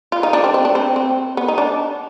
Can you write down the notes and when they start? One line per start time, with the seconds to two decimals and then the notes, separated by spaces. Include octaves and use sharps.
0.12 F4
0.23 D#4
0.33 D4
0.44 C4
0.54 C4
0.65 D4
0.75 C4
0.96 C4
1.37 B3
1.48 D#4
1.58 D4